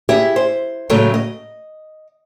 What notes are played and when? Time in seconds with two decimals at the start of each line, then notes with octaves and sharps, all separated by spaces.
0.09 E4 G4 G#4 E5
0.36 C5
0.90 A2 C#3 F#3 G#3 A3 C#4
1.14 D#5